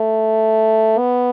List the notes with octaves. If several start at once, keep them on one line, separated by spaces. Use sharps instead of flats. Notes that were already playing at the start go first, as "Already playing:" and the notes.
Already playing: A3
B3